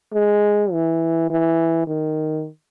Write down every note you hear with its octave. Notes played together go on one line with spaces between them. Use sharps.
G#3
E3
E3
D#3